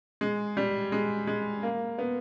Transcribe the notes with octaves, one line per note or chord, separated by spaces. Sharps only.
G#3
G3
G#3
G#3
A#3
B3